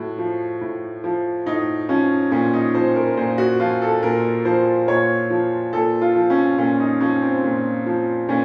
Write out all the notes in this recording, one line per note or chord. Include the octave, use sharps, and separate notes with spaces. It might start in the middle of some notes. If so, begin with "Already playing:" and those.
Already playing: A2 F#4
F3
A2
F3
A2 D#4
F3 C#4
A#2 C#4
D#4
F3 C5
A#4
A#2 C5
F#4
F3 F4
A4
A#2 A#4
F3 C5
A#2 C#5
F3
A#2 A4
F4
F3
C#4
A#2 C#4
D#4
F3 C#4
C4
A#2
F3
A#2 C#4